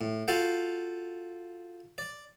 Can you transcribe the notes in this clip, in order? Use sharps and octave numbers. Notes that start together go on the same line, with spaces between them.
A2
F4 F#4 A4 F5 G5
D5